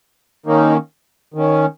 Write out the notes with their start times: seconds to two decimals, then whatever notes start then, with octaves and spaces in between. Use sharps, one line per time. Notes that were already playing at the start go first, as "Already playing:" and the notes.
0.46 D#3 A#3 C#4 D#4
1.34 D#3 C#4